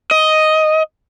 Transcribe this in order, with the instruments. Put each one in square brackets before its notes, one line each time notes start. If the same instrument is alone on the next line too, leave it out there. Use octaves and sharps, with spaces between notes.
[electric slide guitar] D#5